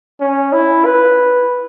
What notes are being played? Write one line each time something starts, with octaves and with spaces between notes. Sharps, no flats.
C#4
E4
B4